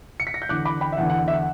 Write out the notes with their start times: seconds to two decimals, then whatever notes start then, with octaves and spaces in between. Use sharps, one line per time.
0.20 C#7
0.27 B6
0.34 A#6
0.42 G6
0.49 E2 D3 D6 F#6
0.65 B5 D6
0.81 G5 B5
0.92 E5
0.97 E2 D3 F#5
1.10 F#5
1.28 E5
1.33 F#5